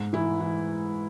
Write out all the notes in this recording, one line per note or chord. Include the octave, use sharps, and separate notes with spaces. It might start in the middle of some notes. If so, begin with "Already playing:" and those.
Already playing: G#2
E3 E4
E3